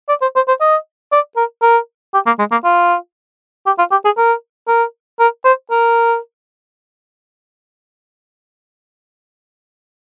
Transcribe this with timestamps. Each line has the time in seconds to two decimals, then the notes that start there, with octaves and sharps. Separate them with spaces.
0.09 D5
0.22 C5
0.35 C5
0.48 C5
0.60 D#5
1.12 D5
1.36 A#4
1.62 A#4
2.14 G4
2.26 A#3
2.39 G#3
2.51 A#3
2.64 F4
3.66 G4
3.78 F4
3.91 G4
4.05 G#4
4.17 A#4
4.68 A#4
5.20 A#4
5.44 C5
5.70 A#4